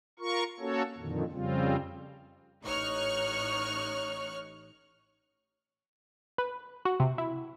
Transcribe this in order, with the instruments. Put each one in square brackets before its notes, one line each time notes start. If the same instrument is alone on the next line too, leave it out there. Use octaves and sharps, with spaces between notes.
[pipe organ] F4 A#4 C#6
A#3 C#4 F#4 A4 C#5
F2 A#2 D3 D#3
F2 C#3 G3 C4 F4
[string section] A1 D#4 C#5 C#6 F6 F#6
[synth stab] B4
F#4
C3
E4